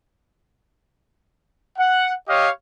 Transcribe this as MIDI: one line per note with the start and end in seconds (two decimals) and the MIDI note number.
1.78 2.13 78
2.29 2.49 67
2.29 2.49 73
2.29 2.49 75
2.29 2.49 77